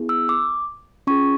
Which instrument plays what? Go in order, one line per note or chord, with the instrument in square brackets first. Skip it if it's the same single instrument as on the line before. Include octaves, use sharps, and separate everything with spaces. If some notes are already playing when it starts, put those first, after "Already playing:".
Already playing: [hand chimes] B3 E4 G#4
E6
D6
C#4 F4 G#4 C#6